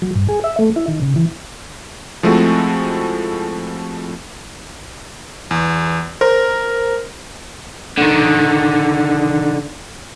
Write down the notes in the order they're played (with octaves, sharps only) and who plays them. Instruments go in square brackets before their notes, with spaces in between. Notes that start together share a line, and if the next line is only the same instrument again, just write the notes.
[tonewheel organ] F#3
G2
G#4
E5
A3
E4
D#3
C#3
E3
[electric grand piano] F3 G#3 A3 C4 E4 F#4
E2
[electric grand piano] A#4 [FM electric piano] C5
[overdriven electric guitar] D3 D#3